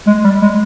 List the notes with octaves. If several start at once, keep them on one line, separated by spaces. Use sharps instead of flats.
G#3
G3
G#3